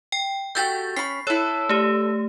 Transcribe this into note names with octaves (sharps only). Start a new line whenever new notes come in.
G5
A3 F#4 G4 G6 A6
C#4 B5 C7
E4 A4 C#5
A3 G4